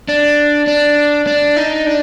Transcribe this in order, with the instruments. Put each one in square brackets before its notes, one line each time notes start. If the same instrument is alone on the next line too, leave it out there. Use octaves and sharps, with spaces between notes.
[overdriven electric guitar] D4
D4
D4
D#4
D4